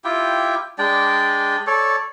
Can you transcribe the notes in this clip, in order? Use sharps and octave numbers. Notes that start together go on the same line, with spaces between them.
E4 F4 G4 G5
G#3 D4 D5 G5
A4 C#5 D5